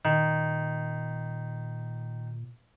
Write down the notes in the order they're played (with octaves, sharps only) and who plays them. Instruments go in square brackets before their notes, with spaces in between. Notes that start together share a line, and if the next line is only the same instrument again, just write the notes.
[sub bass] A#2 [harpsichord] D#3